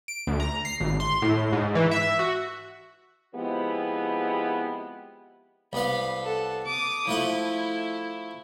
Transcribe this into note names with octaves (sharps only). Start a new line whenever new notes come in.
D7
D2
A#5
C7
G#1
C6
A2
G#2
E3
E5
F#4
F3 G#3 B3 C4 E4 G4
C2 B3 F5 B5
A4 F#5
D6 D#6
F3 A3 E4 F#5